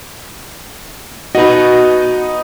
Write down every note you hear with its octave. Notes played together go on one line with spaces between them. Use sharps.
D#4 F#4 B4 D#5